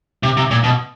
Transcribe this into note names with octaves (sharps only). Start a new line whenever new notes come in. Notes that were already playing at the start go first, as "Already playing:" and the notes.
C3
C3
A#2
B2